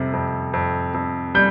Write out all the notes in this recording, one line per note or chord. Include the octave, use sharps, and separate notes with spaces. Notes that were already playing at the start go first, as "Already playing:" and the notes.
Already playing: F2 C3 G3
F2
F2
F2
G3 G6